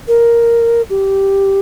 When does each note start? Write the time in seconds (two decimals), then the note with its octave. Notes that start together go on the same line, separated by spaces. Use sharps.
0.08 A#4
0.90 G4